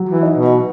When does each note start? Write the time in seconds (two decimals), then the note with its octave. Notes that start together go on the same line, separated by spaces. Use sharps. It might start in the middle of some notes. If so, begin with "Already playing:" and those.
Already playing: F#3
0.09 E3
0.23 D#4
0.37 B2